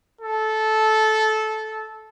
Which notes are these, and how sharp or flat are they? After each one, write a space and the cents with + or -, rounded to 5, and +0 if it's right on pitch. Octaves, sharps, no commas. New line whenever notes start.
A4 -15